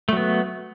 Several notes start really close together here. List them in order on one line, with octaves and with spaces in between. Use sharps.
A3 F#3 B3